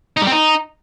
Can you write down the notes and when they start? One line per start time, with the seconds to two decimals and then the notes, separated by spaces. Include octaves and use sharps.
0.17 D#4
0.22 G3
0.27 C4
0.32 D#4